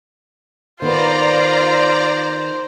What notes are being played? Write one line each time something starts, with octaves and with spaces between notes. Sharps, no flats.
D#3 B3 F4 B4 C5 D5 A#5